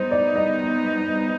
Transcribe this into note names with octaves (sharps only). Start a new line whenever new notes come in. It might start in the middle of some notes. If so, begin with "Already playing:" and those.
Already playing: G3 B3 D#4 C5
D5
D#5